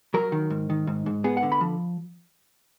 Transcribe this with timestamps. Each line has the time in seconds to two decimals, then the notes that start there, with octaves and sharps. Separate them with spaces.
0.14 F#3 A#4
0.32 D#3
0.50 G#2
0.70 D#3
0.87 G#2
1.06 G#2
1.24 B3 G#4
1.37 F#5
1.43 D3
1.52 B5
1.61 F3